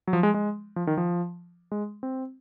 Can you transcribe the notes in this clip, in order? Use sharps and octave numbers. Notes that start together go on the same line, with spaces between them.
F#3
F3
G#3
G#3
F3
D#3
F3
G#3
C4